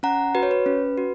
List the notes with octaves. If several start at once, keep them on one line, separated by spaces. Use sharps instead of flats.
C#4 F#5 A#5
F#4 B4
C#5
B4
C#4
F#4